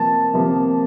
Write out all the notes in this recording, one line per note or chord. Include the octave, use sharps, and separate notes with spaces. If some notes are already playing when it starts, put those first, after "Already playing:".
Already playing: C3 F3 A#3 A5
C3 F3 A#3